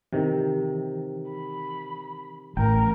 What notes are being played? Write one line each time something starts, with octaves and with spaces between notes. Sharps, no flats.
C3 D#3 E3 G4
B5
A1 A#4 G5